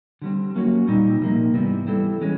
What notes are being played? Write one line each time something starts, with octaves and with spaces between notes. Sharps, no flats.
D3 G3 C4
F#3 A#3 C#4 F#4
A#2 G3 C4 D#4
C3 F3 A#3 D#4
G#2 E3 G3 B3
G3 C4 E4 A4
E3 G#3 C#4